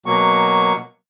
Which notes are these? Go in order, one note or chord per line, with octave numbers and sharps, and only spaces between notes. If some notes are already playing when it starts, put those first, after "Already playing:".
B2 F#3 A#3 C#6